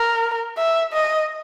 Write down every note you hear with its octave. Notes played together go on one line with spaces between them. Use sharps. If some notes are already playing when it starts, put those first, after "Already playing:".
Already playing: A#4
E5
D#5